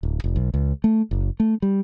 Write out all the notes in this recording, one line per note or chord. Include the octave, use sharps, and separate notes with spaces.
D1
F1
B1
C#2
A3
F#1
A3
G3